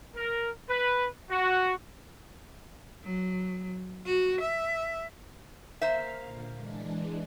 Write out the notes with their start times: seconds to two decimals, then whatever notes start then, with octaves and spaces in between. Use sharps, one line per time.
0.15 A#4
0.67 B4
1.30 F#4
3.04 F#3
4.06 F#4
4.41 E5
5.81 A#3 C5 E5 F5
6.21 A#2 D3
6.52 E3 G#3 D4